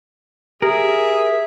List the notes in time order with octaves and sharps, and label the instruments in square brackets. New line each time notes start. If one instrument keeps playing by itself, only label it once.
[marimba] G4 [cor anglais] G#4 [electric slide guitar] A#4 [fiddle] E5